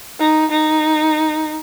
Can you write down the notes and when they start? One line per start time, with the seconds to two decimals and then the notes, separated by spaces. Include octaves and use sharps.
0.19 D#4
0.51 D#4